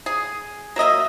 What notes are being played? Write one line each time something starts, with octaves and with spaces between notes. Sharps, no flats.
G#4
F#3 A#3 D#5 E5